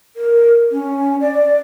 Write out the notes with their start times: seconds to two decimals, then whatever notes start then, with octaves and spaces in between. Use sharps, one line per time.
0.16 A#4
0.72 C#4
1.21 D5